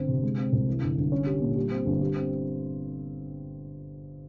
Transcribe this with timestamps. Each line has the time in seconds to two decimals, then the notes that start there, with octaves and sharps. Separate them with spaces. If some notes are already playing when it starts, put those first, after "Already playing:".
Already playing: G1 C4
0.08 C3
0.23 G#3
0.38 C4
0.52 C2
0.68 E3
0.82 G1
0.97 G1
1.12 C#4
1.26 G4
1.42 A#2
1.57 G3
1.71 C4
1.86 G1
2.01 G3
2.16 C4